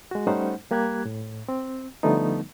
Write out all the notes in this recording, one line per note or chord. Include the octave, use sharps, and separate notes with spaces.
G#3 F#4
G3 A3 C#4 D#4 C5 F#5
G3 A#3 G4 F#6 G#6
A2
C4
D3 F3 G3 A3 B3 D#4